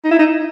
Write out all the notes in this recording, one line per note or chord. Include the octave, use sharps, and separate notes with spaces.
D#4
E4
D#4